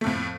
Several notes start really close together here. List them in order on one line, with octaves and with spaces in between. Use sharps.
A3 F2 A2